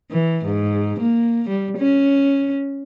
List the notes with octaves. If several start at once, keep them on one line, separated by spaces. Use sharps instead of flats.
E3
G#2
A#3
G3
C#4